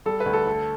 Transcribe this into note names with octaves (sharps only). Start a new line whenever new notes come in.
G3 A4
B4
D2
A4
A3 A4